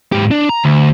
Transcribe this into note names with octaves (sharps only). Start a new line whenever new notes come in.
G#2 G4
D4
A#5
D2